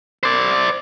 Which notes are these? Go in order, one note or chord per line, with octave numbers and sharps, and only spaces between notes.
C5 D5